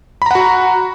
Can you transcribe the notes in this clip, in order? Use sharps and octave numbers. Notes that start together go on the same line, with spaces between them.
F#4 F#5 A#5 B5